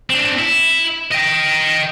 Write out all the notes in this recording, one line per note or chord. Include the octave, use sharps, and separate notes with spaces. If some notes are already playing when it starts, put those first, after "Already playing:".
C4 D4
E4
D#5 G5